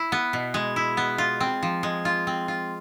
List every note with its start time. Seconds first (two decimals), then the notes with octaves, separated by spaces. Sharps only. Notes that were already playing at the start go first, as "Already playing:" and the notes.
Already playing: E4
0.12 B3
0.33 B2
0.54 G#3
0.76 E4
0.97 B3
1.18 F4
1.41 C4
1.63 F3
1.83 G#3
2.05 F4
2.27 C4
2.48 F4